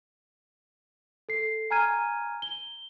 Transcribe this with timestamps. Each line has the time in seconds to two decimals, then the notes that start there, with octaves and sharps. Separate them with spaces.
1.29 A4 C7
1.71 G#5 A#5 F6 G#6 D#7
2.42 G7